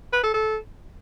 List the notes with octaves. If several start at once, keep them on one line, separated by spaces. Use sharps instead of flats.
B4
A4
A4